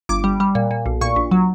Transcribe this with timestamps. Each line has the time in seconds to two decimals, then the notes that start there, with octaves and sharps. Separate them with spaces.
0.09 G1 D6
0.24 G3
0.40 G3
0.55 A#2
0.71 A#2
0.86 B1
1.01 A#2 C#6
1.16 A#1
1.31 F#3